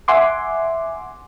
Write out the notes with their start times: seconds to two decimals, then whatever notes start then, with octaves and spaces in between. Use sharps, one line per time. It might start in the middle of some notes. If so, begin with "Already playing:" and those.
0.08 E5 F#5 G#5 C6 D6